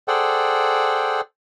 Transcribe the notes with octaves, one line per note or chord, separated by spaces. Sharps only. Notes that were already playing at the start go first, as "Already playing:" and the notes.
G#4 A4 C5 D5 F#5 G5